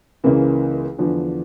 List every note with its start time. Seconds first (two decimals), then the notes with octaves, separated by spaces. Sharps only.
0.24 C#2 C#3 E3 A#3
0.99 E2 D3 F3